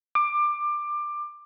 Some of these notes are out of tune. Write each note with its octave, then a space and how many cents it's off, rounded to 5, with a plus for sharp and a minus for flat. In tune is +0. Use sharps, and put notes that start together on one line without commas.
D6 +20